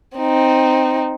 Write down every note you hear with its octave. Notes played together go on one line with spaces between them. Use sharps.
C4 D#4